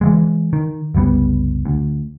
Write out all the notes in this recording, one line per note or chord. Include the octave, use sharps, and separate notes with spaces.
E3 F3 G#3
D#3
F#1 C2 G3 B3
D2